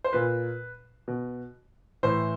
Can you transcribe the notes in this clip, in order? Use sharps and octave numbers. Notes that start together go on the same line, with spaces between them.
C5
A#2 B4
B2
A2 E3 C5